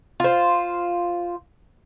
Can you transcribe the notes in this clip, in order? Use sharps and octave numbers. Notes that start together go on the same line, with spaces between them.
F4 C5